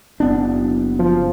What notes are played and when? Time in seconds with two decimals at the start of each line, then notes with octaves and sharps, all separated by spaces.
0.20 F#1 B3 D4
0.99 F3